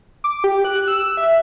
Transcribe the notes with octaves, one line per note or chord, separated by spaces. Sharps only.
D6
G4
F#6
E6
E5